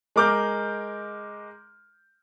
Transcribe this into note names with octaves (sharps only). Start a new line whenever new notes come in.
G#3 A#4 D6 F6 G6